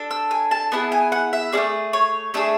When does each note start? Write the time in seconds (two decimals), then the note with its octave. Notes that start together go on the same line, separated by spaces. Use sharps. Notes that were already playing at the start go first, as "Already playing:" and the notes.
Already playing: D4 A4
0.11 E6
0.31 G#5
0.51 A5
0.72 B3 E4 G#4 A5
0.92 G#5
1.12 F#5
1.33 E5
1.52 A3 C#4 G#4 D5
1.93 C#5
2.34 A3 D4 G#4 E5